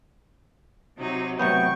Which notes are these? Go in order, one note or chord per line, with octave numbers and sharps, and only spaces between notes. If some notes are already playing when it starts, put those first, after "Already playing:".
C3 F#3 D#4
A2 C3 F#3 B3 G5 C#6